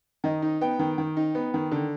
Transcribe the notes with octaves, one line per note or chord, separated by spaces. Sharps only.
D#3 D#5
D#4
B3 G5
D#3
D#3
D#4
B3
D#3
D3